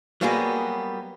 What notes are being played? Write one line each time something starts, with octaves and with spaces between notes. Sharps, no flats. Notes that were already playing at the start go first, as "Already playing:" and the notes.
F#3 G3 A#3 B3 F#4 G#4